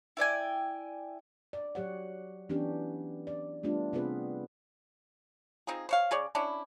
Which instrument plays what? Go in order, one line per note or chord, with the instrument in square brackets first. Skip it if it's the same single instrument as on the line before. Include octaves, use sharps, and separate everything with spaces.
[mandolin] E4 D5 G5 G#5
[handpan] D5
F#3 G4 C#5 F#5
E3 B3 C#4 D4 G4
D5
G3 A3 B3 D4 F4
C3 B3 C4 F4 G#4 B4
[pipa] C4 D#4 F4 G#4
C5 C#5 F5
C#3 G#4 C#5 D5
C#4 D4 E4